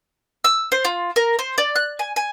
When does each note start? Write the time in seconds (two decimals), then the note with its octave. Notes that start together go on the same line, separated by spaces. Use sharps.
0.44 E6
0.72 C5
0.85 F4
1.16 A#4
1.39 C5
1.58 D5
1.76 F#6
1.99 G#5
2.16 G#5